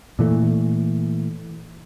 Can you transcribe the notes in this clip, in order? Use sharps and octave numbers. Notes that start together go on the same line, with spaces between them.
A#2 E3 A3